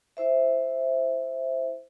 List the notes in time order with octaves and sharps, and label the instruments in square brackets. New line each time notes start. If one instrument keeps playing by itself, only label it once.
[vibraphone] E4 C5 E5